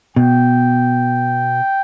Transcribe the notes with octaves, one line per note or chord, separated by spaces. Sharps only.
B2 G5